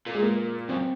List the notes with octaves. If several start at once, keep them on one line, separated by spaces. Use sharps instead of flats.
A#2 A#3
G#3
A#3
F#2 C4